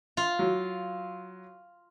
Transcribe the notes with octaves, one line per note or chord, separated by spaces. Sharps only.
F4
F#3